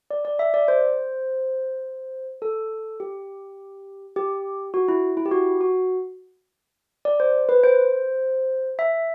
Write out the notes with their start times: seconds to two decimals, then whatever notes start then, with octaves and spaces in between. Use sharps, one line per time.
0.11 D5
0.25 D5
0.39 E5
0.54 D5
0.68 C5
2.42 A4
3.00 G4
4.16 G4
4.74 F#4
4.88 E4
5.17 E4
5.26 G4
5.31 F#4
5.61 F#4
7.05 D5
7.20 C5
7.49 B4
7.64 C5
8.79 E5